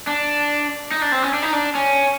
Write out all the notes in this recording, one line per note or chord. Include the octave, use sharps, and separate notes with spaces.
D4
D#4
D4
C4
C#4
D4
D#4
D4
C#4